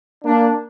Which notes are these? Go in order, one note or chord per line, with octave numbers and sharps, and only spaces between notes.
A#3 D4